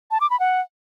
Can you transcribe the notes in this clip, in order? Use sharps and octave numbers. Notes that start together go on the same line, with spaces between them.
A5
D6
B5
F#5